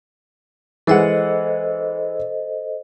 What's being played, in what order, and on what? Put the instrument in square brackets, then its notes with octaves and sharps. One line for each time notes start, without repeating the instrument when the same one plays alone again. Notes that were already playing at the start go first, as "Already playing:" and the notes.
[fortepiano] E3 G#3 F#5 [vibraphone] A4 C5 D#5